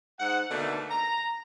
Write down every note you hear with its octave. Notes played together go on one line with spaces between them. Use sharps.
G#2 F#5
B2 D3 D#3 A3 A#3
A#5